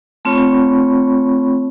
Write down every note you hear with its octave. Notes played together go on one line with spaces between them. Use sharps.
A3 C4 F4 C#5 B5 C#6